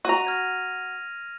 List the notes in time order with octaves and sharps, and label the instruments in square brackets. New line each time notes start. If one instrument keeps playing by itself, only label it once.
[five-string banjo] F#4 A#5 [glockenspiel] D#7 F7
[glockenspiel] F6 G#6 A#6